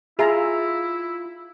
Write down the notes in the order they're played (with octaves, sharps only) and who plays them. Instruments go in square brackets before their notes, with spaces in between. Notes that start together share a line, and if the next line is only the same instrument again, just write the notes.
[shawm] E4 [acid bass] F4 [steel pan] G#4 E5 A#5